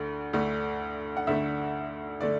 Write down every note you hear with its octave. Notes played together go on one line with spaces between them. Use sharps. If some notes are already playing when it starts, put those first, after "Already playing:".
Already playing: D2 D3 A3
D2 D3 A3
F#5
D2 D3 A3 E5
D3 A3 D5